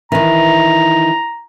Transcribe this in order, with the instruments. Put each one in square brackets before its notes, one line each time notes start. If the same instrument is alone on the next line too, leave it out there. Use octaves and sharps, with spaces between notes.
[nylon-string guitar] D#3 E3 [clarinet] A#5